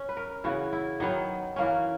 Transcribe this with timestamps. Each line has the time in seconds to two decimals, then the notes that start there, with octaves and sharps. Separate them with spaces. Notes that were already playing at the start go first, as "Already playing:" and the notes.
Already playing: C#4
0.09 B4
0.17 A#4
0.44 C#3 E3 B3 F#4
0.73 E4
1.00 D#3 F#3 B3 D#4
1.56 E3 A#3 C#4